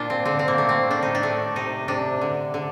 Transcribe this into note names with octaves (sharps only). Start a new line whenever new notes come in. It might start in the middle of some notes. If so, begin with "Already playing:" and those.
Already playing: A#2 D4 F4
C4
D3 C4
C4
A#3
A3
C4
A2 D4
D#4
D4
A3
C3 D#4
C3 D4
D3
D3